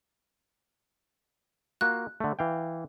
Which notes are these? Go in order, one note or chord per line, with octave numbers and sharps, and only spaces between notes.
A#3 F4 F#4 F#6
D3 A3
E3 F5 G5